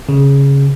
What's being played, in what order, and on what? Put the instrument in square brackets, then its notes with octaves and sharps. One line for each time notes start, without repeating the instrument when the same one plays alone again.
[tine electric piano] C#3